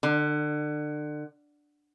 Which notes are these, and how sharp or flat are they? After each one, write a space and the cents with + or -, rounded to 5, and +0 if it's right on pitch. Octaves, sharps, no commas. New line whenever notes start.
D3 +30